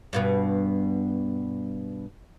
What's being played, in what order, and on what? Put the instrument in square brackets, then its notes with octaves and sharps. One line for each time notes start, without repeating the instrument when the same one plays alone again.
[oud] G2 B2 B3